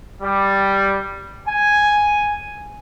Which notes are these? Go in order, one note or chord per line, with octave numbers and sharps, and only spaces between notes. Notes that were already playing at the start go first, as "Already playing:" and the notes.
G3
G#5